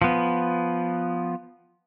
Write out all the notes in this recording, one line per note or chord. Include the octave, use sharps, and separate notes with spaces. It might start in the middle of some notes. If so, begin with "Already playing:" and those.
F3 B3